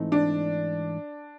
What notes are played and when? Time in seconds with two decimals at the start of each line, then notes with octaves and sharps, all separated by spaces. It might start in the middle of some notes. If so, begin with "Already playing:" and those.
Already playing: G#2 E3 A3 C4 D#4
0.12 D4